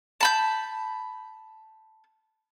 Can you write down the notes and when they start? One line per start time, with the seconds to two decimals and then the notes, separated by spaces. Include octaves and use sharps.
0.21 A5 B5 G6